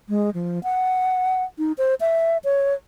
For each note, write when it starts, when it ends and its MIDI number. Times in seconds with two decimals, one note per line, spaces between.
0.09 0.30 56
0.34 0.59 53
0.63 1.43 78
1.58 1.72 63
1.78 1.95 72
2.01 2.38 76
2.44 2.74 73